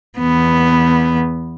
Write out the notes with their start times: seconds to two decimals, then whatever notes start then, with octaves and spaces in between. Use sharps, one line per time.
0.18 E2 B3